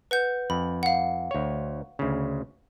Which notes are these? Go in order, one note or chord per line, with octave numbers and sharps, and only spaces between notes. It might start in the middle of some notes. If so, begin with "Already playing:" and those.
B4 F#5 G6
F2 B5
F5 F#5
D2 C#5
D2 C#3